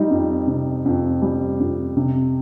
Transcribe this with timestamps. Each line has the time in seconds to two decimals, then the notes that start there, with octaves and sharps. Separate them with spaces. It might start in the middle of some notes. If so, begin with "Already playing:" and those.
Already playing: G3 D#4
0.10 F2
0.47 C3
0.85 F2
1.22 G3
1.60 F2
1.97 C3